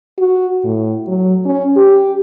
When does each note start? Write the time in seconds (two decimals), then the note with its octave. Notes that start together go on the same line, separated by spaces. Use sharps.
0.18 F#4
0.64 A2
1.08 F#3
1.45 C#4
1.77 G4